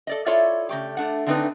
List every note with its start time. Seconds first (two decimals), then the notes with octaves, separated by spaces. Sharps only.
0.07 A4 D5 D#5
0.26 E4 F4 A4 C#5 D5 E5
0.69 C#3 A3 G4
0.97 A3 D4 F#5
1.27 D3 A3 C4 D4 D#4 B4